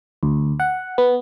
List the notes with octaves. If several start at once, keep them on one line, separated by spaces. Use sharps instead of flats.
D2
F#5
B3